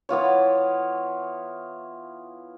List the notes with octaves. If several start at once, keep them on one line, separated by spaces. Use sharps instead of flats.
E3 B3 F4 C#5